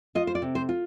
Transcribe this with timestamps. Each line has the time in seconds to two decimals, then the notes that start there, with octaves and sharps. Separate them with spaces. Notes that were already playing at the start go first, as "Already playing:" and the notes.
0.15 F4 D#5
0.27 C5
0.35 D5
0.42 C3
0.55 C5
0.69 F4